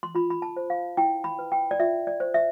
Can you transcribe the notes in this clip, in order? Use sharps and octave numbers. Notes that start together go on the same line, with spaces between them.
C6
F4 B5
B5
A5
C5
F5
E4 G5
B5
B4
G5
D5
F4 E5
D5
C5
E5